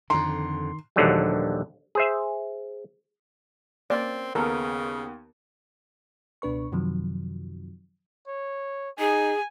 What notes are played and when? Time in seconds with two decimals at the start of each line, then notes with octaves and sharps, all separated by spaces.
0.10 F2 D3 D#3 A#5 C6
0.96 A#1 D#2 D3 F#3 G3
1.95 G#4 C5 E5
3.90 A#3 C4 C#4 F4 D5
4.35 D#2 C#3 B3 A4 A#4
6.42 C#2 B2 D4 B4 C#6
6.72 F#2 C3 D#3 F3 F#3
8.28 C#5
8.99 D#4 G#4 G#5